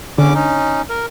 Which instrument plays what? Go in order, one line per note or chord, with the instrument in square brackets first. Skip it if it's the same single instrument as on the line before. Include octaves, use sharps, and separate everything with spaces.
[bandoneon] E2 C#4 D6 [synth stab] D3
[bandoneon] C#4 D#4
A#4